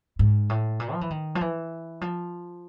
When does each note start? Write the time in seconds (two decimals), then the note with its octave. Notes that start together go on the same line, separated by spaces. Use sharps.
0.19 G#2
0.50 A2
0.80 A#2
0.93 F3
1.01 E3
1.10 D#3
1.35 F3
1.41 E3
2.01 F3